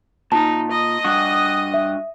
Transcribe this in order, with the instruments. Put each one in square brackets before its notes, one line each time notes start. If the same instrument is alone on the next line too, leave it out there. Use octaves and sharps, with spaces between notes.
[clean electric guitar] A#2 [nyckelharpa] D#4 [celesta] A5
[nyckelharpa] D#5 D#6
[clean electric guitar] G2 F#4
[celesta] E5